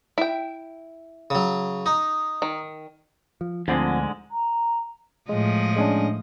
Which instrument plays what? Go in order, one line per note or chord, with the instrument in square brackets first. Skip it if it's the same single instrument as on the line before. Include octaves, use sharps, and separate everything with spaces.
[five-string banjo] E4 G5
[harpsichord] C#3 F#3
D#4
[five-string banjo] D#3
[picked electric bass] F3
[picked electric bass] D2 [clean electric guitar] G#2 D3 G#3 [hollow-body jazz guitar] F3 C4
[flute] A#5
[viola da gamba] A2 F3 D#5 [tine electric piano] G#3
[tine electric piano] G#3 C#4 D4